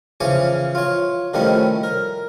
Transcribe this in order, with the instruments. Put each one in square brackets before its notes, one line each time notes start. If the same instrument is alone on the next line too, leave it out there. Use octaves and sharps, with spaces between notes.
[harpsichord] C#3 E3 F3 G#5 C#6 D6
F4 C#5
D#3 F3 G3 A3 C#4 E4
A#4